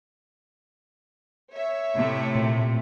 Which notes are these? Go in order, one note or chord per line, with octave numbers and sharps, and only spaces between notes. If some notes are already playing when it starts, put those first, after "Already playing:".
C#5 E5
A2 C3 A3
A#2